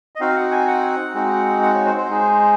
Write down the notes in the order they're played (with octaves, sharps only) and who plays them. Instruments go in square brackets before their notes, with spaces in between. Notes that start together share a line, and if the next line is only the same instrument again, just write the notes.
[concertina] D#5
C4 D#4 F#4 F5
F#5
G#5
F#5
G#3 C4 D#4 F#4
F#5
C#5
C5
C5
G#3 D#4 G#4